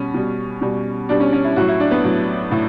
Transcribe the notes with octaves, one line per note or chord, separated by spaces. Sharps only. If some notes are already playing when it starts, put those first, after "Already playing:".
Already playing: B2 G3 C#4
B2 G3
B2 G3
B2 G3 D4
C#4
C#4
E4
A2 F#3 F#4
E4
D4
B3
A2 F#3
A2